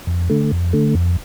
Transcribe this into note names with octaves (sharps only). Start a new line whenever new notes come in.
F2
D3 A3
F2
D3 A3
F2